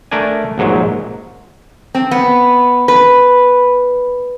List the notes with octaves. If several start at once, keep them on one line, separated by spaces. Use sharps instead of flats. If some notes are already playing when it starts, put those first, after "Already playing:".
A3 D4 A#4 D5 G#5
A#1 G#2 F#3
C4
B3
B4